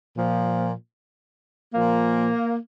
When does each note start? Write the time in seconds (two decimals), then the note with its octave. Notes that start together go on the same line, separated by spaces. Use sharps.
0.15 A#2 F3
1.73 A#2 F3 A#3